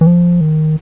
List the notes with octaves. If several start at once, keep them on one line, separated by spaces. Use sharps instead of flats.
E3
F3
D#3